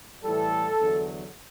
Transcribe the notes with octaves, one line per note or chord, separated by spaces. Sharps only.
A2 E3 G3 A4
E2 D3 F#3